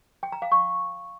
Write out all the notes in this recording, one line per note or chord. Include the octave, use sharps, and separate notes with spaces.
G5
A#5
F5
C#6